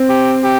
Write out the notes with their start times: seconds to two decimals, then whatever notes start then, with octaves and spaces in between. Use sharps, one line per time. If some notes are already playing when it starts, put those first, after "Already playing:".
Already playing: C4
0.09 G4
0.44 G4